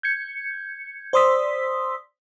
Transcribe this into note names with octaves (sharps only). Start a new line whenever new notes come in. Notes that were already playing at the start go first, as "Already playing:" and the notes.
G6 G#6 C#7
C5 D5 C6 D#6 E6 B6